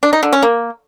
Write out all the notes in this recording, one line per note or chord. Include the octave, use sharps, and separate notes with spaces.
D4
D#4
D3
C#4
A#3